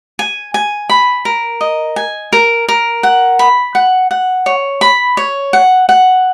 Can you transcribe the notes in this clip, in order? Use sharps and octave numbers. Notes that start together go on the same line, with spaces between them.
G#5
G#5
B5
A#4
D#5
G#5
A#4
A#4
F#5
B5
F#5
F#5
C#5
B5
C#5
F#5
F#5